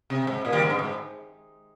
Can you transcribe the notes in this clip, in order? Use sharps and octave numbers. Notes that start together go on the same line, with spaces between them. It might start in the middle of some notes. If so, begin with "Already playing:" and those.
C3
G#2
A#2
D#3 G3
G#2
G2
G#2